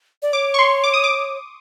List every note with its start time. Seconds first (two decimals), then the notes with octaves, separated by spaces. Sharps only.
0.22 D5
0.33 C#5 D6
0.54 C#6
0.59 C6
0.84 D6
0.94 D#6
1.04 D6